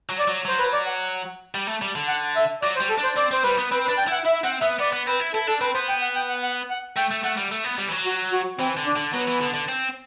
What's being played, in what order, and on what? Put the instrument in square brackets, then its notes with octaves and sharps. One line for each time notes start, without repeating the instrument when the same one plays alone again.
[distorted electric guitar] F#3
[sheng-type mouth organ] D5
[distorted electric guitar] F#3
[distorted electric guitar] F#3 [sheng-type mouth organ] C5
[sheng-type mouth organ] B4
D5
F#5
[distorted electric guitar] G3
A3
G3
D3
[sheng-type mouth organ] F#5
E5
[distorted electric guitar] F#3 [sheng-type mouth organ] D5
[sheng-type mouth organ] C5
[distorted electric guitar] G3
[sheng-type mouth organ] A4
[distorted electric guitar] D4
[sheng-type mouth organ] C5
[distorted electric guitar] C4 [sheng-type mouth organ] D5
[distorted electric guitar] C4 [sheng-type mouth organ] C5
[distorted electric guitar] G3 [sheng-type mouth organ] B4
[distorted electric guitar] B3
[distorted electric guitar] C4 [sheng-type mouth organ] B4
[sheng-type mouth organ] B4
[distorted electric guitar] D4
[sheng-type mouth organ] G5
[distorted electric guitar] E4 [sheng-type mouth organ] F#5
[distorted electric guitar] E4 [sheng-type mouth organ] E5
[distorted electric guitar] C4 [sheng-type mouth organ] F#5
[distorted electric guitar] B3 [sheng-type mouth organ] E5
[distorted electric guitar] B3 [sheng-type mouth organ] D5
[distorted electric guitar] B3
[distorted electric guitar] C4 [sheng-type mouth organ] B4
[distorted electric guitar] E4
[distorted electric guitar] E4 [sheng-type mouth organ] A4
[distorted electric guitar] D4 [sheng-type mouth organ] A4
[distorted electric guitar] C4 [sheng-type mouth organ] B4
[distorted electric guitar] B3 [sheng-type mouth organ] C5
[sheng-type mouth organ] G5
F#5
G5
F#5
F#5
F#5
[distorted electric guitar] A3 [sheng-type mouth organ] G5
[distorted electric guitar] A3
[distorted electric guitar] A3 [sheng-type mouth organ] F#5
[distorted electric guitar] G3
A3
B3
G3
E3
F#3
[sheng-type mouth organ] F#4
F#4
[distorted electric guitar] E3 [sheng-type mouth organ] C4
[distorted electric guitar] D3
[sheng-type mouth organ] D4
[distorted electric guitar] D3
[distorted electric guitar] F#3 [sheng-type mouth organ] B3
[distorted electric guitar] E3
D3
D3
C4